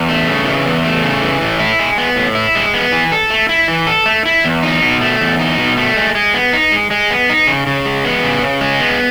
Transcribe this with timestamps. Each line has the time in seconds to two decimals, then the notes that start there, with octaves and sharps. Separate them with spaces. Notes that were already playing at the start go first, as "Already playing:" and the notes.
Already playing: E2
0.09 A3
0.27 C#3
0.45 E3
0.65 E2
0.84 A3
1.03 C#3
1.22 E3
1.41 A2
1.59 E4
1.79 G#3
1.98 B3
2.16 A2
2.35 E4
2.55 G#3
2.74 B3
2.92 E3
3.12 A4
3.30 A3
3.49 E4
3.68 E3
3.87 A4
4.06 A3
4.25 E4
4.45 E2
4.63 D#4
4.82 B2
5.01 A3
5.21 E2
5.39 D#4
5.58 B2
5.77 A3
5.96 G#3
6.15 G#3
6.34 B3
6.53 D#4
6.72 G#3
6.91 G#3
7.10 B3
7.29 D#4
7.47 C#3
7.67 C#3
7.86 G#3
8.05 B3
8.23 C#3
8.42 C#3
8.61 G#3
8.80 B3